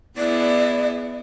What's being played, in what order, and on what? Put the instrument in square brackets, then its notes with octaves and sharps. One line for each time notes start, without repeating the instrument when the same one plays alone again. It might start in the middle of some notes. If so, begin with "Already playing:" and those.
[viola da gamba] B3 E4 G#4 [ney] D5